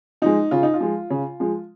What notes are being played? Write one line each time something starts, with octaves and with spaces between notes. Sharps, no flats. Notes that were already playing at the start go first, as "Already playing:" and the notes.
F3 G#3 D#4
C#3 F4
D#4
F4
F3 G#3
C#3
F3 G#3